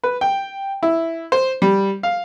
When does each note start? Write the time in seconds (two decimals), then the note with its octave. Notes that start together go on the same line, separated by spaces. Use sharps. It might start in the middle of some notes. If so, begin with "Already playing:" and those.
0.04 B4
0.21 G5
0.83 E4
1.32 C5
1.62 G3
2.03 F5